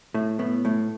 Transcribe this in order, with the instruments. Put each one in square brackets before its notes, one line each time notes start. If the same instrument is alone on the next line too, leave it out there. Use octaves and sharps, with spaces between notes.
[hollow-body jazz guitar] A2 A3
A2 B3
A2 A3